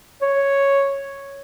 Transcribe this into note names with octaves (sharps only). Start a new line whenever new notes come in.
C#5